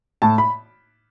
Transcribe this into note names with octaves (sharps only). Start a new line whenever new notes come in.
A2 A5
B5